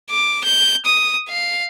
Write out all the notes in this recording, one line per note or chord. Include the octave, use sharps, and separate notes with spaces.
D6
G6
D#6
F5